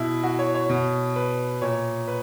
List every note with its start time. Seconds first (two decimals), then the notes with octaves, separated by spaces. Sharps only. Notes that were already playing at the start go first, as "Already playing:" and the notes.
Already playing: B2 E4
0.23 F#4
0.39 C#5
0.55 C#5
0.69 B2
1.16 B4
1.62 A#2 C#5
2.07 B4